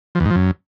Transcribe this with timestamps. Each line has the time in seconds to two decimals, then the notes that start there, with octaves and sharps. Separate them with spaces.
0.15 F3
0.20 E2
0.25 G#2
0.30 F3
0.36 F#2